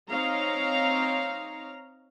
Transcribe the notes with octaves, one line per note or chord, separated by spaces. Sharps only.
C4 D#4 C#5 F5 A#5